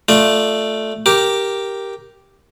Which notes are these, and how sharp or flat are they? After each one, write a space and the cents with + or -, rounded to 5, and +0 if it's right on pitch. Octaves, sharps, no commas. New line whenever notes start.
A3 +0 F4 +0 D5 +15
G4 -5 A#4 +0 D6 +0